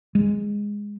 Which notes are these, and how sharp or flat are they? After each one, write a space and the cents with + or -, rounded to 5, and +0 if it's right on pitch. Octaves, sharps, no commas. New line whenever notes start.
G#3 -10